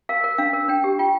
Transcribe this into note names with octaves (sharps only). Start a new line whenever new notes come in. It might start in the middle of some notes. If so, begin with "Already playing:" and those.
A#4 F5
A#4
D4 F5
A#4
D4 G5
G4
F4 G5